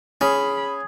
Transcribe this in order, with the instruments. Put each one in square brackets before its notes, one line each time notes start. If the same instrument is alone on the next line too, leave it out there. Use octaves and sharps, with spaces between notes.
[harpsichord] C#4 [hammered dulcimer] G#4 [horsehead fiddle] B5